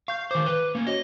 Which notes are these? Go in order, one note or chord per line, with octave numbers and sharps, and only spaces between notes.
F5 C#6 G6
D#3 C5 D6
B4
A#3 C#4
C#4 F#4 C#5 D#5